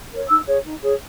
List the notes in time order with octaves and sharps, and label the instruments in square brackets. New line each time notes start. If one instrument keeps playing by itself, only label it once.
[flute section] A#4 C#5
D#4 E6
G#4 C#5
D#4
G#4 C#5